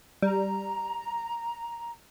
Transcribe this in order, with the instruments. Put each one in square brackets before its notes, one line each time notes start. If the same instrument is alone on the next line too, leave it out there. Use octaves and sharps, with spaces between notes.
[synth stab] G3 [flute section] A#5